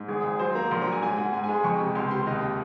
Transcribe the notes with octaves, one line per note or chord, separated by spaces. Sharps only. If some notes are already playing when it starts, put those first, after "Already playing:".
Already playing: G#2
G#1 G#4
G#1
F#3 C5
A#3 A#5
A#1 C6
A#5
F#3
G#5
G#2 G#5
G#2 F#5
G#2 G#5
G#5
G#3 C6
F2 C#6
C3
C#2 C6
C3 C6
D#2 D#5